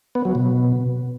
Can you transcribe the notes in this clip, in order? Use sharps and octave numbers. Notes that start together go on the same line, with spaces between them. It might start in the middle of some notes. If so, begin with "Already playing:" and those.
B3
F#3
B2